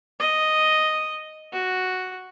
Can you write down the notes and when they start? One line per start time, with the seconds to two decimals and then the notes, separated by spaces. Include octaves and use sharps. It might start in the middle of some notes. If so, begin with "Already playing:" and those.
0.20 D#5
1.52 F#4